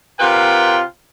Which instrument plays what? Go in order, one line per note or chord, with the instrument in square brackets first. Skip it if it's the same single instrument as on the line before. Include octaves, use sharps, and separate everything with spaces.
[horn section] C3 F4 A#4 B4 F#5 G5